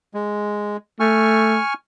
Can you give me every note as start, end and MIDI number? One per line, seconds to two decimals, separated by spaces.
0.14 0.77 56
1.00 1.59 57
1.00 1.74 80
1.00 1.74 85
1.00 1.74 89